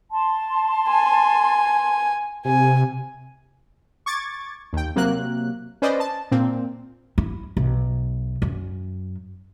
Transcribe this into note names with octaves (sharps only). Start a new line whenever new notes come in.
A5 C6
G#5
C3 G#5
C#6 D6 G#6 A6
D#2 G5
C3 F#3 A#3 F#6
C#4 B4 C5 D5 D#5
A5
A#2 C4
E4
B1
F#2